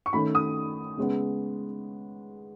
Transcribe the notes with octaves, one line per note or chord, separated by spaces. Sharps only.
C#6
D#3 A3 C#4 B5
D#6
C#3 G#3 B3